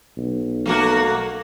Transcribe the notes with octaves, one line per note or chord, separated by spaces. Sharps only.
B1
A3 A#3 F#4